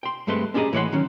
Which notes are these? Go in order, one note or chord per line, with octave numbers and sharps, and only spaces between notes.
G5 C6
G2 G#3 A3 C4 B4 C6
C#4 D4 G4 G#4 D#5 A#5
A2 E3 C#5 D5 F#5 C6
D#3 F#3 C#4